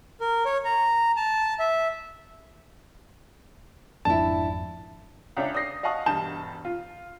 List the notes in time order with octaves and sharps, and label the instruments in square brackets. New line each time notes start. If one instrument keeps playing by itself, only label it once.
[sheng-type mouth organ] A#4
C#5
A#5
A5
E5
[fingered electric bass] G#1 F2 [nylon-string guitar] D4 E4 [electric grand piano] A5
[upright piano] C#2 C#4 D4 E5
D5 D#6 G6 A#6 C7
D#5 F5 F#5 A5 C#6 D#6
E1 G2 A5 G6 E7
F4